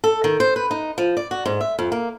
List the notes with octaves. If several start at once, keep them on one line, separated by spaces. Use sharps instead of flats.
A4
D#3
C5
B4
D#4
F3
D5
F#4
G#2
E5
F2
A#3